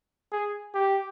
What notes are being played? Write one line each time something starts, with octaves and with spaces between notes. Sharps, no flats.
G#4
G4